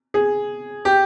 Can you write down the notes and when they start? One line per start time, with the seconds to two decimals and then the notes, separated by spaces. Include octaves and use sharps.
0.14 G#4
0.85 G4